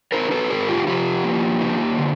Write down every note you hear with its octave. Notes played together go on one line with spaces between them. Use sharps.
D#4 A#4 C5
A4 B4
G#2 G#4 A#4
F4 G4
F3 F4 G4
A#3
D#4
D3